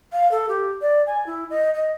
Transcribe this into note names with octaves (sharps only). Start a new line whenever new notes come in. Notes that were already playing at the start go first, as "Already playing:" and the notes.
F5
A4
G4
D5
G#5
E4
D#5
D#5